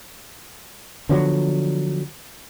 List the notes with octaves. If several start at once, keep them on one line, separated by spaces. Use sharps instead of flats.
D3 F3 F#3 B3